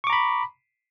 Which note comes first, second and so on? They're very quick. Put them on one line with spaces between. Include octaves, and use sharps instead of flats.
C#6 D6 A#5 B5